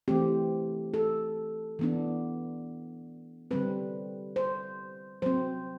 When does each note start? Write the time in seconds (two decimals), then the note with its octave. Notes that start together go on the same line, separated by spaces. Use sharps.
0.08 E3 A3 C4 G4
0.94 A4
1.79 E3 B3 D4
3.51 D3 G3 C4 B4
4.36 C5
5.22 F#3 C4 C5